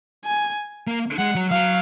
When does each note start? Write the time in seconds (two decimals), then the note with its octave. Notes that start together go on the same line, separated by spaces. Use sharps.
0.25 G#5
0.87 A#3
1.19 G#3 F#5
1.35 F#3
1.50 F#3 F5